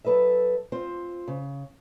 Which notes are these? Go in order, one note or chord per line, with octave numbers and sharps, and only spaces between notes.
F#3 A4 B4 D#5 E5
C4 F4 C5
C#3